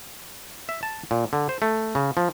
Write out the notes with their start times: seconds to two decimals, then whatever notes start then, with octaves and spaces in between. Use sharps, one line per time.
0.69 E5
0.83 A5
1.11 A#2
1.33 D3
1.49 C5
1.62 A3
1.95 C#3
2.17 F3